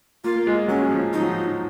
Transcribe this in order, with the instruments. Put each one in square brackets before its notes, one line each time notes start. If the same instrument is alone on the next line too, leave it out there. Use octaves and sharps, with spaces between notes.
[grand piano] A#3 [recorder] F4
[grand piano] A#3
G#3
[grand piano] F#3 [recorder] C#4
[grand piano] F#3
F3
[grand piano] F3 [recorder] D#4
[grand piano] F#3
F3